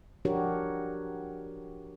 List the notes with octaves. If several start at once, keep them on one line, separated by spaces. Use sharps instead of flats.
F3 D4 F#4 G4 A#4 C#5